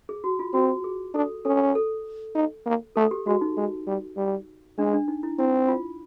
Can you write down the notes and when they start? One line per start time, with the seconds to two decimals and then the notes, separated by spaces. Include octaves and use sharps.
0.09 G#4
0.24 F#4
0.39 F4
0.53 C4 F#4
0.84 G#4
1.14 D4 A4
1.45 C#4 A4
1.75 A4
2.35 D#4
2.66 A#3
2.96 A3 A4
3.11 G4
3.26 G#3 F#4
3.41 D#4
3.57 G#3
3.87 G3
4.17 G3
4.78 G#3 D4
4.93 D4
5.08 D#4
5.23 E4
5.39 C4 E4
5.68 F4